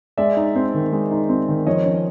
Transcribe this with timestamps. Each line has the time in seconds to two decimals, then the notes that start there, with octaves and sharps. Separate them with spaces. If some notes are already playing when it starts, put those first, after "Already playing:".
0.17 G#3 D5 E5
0.37 D#4
0.55 C4
0.74 D#3
0.92 G#3
1.11 D#4
1.29 C4
1.48 D#3
1.66 F3 C#5 D#5
1.85 C#4